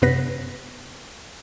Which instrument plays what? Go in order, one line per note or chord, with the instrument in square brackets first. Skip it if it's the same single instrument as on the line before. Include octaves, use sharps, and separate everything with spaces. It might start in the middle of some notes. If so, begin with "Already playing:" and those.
[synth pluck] F#2 C3 B3 B4 A#6 B6